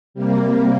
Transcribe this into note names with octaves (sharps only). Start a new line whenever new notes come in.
C3 G3 A#3